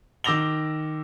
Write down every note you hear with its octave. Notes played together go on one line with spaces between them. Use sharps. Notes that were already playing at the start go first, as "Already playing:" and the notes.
D#3 D6 E6 A#6 F7 G7